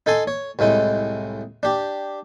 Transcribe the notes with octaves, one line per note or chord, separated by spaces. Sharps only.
D#4 A4 G#5 C6
C#5
C2 A2 G#3 D#4
D4 G4